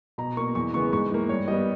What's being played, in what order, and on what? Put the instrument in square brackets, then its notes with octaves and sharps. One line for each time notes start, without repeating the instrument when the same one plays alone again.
[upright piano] B2 A#5
A#3 C#6
E2 C#6
C#3 E3 G#3 B3 C#6
G#2 C#6
E3 A#3
G2 C#5
G3 B3 D#5